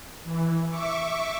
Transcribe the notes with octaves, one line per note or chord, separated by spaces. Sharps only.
E3
E5 C#6 D6